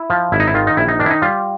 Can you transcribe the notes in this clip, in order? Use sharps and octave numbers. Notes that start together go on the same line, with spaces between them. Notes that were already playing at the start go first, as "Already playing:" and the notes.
Already playing: E4
F3
G#1 E4
D#4
E4
D#3 F4
D#4
A#1 E4
D#4
D#3 D4
E4
D#4
G3 F4